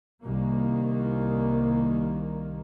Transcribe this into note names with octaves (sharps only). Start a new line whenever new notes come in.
C2 D#3 A#3